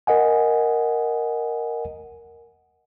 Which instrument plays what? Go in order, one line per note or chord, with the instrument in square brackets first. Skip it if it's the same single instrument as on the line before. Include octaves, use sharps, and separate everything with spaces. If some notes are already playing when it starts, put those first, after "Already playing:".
[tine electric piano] A#4 D#5 F#5 G#5